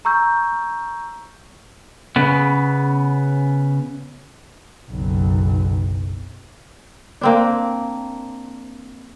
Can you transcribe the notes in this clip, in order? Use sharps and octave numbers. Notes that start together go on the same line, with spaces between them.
A#5 C#6 E6 G6
C#3 B3
F#1 B1
A#3 C4 D4